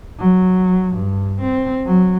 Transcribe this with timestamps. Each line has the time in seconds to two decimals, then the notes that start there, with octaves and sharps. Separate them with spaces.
0.19 F#3
0.95 G2
1.41 C4
1.86 F#3